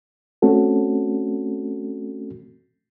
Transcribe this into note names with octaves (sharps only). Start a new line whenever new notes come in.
A3 C4 C#4 F#4 A4